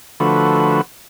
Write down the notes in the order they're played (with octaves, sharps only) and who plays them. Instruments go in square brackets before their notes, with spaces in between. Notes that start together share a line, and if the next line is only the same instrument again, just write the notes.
[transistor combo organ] D3 F3 A3 F#4 B4